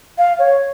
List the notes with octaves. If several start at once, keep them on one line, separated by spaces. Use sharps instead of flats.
F5
C#5